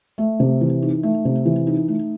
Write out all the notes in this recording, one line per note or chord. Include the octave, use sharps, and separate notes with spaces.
A3
C3
E3
D#4
A3
C3
E3
D#4
A3